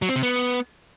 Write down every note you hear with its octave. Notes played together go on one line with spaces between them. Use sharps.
F#3
C4
C3
B3